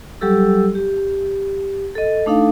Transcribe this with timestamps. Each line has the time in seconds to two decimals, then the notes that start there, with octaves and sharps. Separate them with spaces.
0.21 F#3 G3 G4 A4 E6
0.75 G4
1.95 A4 D#5
2.26 A3 D4 D#4 A4 F5